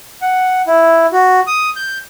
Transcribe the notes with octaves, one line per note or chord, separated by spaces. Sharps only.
F#5
E4
F#4
D#6
G6